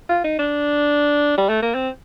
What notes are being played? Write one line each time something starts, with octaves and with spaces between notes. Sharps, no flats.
F4
D#4
D4
G3
A3
A#3
C4